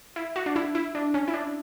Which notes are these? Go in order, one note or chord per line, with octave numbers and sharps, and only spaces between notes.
E4
F#4
D4
E4
E4
D4
C#4
E4
D4